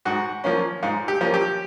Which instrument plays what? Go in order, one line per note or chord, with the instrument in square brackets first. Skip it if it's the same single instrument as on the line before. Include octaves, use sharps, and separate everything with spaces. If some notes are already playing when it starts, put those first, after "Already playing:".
[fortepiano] G#2 F#4
F3 A#3 C#4
G#2 F4
G4
F3 A#3 C#4
G4